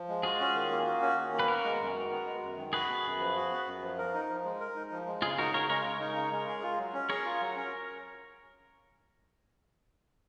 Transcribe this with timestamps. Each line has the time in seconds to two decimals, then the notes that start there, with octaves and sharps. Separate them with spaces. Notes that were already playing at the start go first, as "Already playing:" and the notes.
Already playing: F3
0.09 G#3
0.23 F4 F#4 G#4
0.40 C#4
0.55 D#3
0.71 A#3
0.86 F#4
1.02 C#4
1.18 D#3
1.33 A#3
1.39 B4
1.48 B3 F#4 A#4
1.64 G#3
1.80 F#2
1.96 D#3
2.11 B3
2.26 G#3
2.42 F#2
2.58 D#3
2.73 F#4 G#4 B4
2.89 B3
3.04 F#2
3.20 F3
3.36 F#4
3.51 B3
3.66 F#2
3.82 F3
3.98 A#4
4.14 D#4
4.29 F3
4.45 G#3
4.60 A#4
4.76 D#4
4.92 F3
5.07 G#3
5.22 C#3 F4 G#4
5.38 D#4 F#4 A#4
5.54 C#3 A#4 C#5
5.69 G#3 A#4 C#5
5.84 C#3 A#4 C#5
6.00 D#4
6.16 C#3
6.31 G#3
6.47 G#4
6.63 F4
6.78 F#3
6.94 C#4
7.10 G#4 A#4 C#5
7.25 F4
7.40 F#3
7.56 C#4